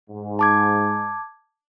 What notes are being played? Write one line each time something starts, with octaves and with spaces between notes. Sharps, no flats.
G#2
A5 D6 G#6